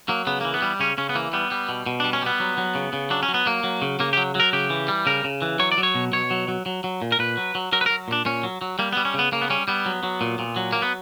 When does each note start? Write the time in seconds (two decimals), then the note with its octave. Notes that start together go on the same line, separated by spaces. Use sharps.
0.09 F#3 A#3
0.27 C#3 B3
0.41 E3 A#3
0.54 B3
0.62 G3
0.80 C#3 C#4
0.98 C#3 C#4
1.09 B3
1.15 E3 A#3
1.33 G3 B3
1.51 G3
1.69 B2
1.86 B2
2.00 D4
2.04 G3
2.13 C#4
2.22 G3 B3
2.40 F#3
2.58 F#3
2.75 C#3
2.93 C#3
3.10 F#3 D4
3.23 C#4
3.29 F#3
3.34 B3
3.46 F#3 A#3
3.64 F#3
3.82 C#3
4.00 C#3 A#3
4.13 G4
4.17 F#3
4.35 F#3 A#4
4.53 C#3 G4
4.70 E3
4.88 G3
5.06 C#3 A#4
5.24 C#3
5.42 E3
5.59 F#3 C#5
5.72 D5
5.78 F#3
5.83 C#5
5.95 B2
6.12 B2 C#5
6.31 F#3
6.48 F#3
6.66 F#3
6.84 F#3
7.02 A#2
7.12 A#4
7.19 A#2 B4
7.37 F#3
7.55 F#3
7.72 F#3 A#4
7.81 B4
7.86 F#3 A#4
8.08 A#2 D4
8.25 A#2 C#4
8.43 F#3
8.62 F#3
8.79 G3 A#3
8.93 B3
8.97 G3
9.05 C#4
9.14 C#3 B3
9.32 C#3 A#3
9.42 B3
9.50 G3 C#4
9.68 G3 B3
9.86 F#3
10.03 F#3
10.21 A#2
10.39 A#2
10.56 F#3
10.73 F#3 A#3
10.82 B3